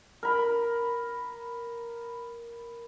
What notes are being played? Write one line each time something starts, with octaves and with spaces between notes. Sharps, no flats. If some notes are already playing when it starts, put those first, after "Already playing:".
A#4 B5